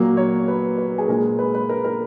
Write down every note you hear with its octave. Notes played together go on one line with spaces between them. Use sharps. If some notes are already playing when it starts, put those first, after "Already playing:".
Already playing: A#2 F#3 A#3
C#5
B4
B4
G#4
A#2 G#3 A#4
B4
B4
A#4
A#4